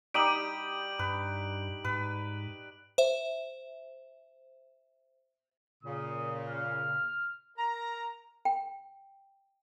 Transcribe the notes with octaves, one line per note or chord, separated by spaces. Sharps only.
G3 D#4 G4 D#6 D7 F#7
G2 B4
G#2 B4
C5 E5
A#2 C#3 D#6
F6
A#4 A#5
G5